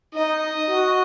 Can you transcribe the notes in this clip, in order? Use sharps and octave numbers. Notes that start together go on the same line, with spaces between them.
D#4 D#5
F#4